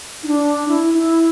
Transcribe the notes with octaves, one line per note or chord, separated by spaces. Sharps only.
D#4
D4
E4
E4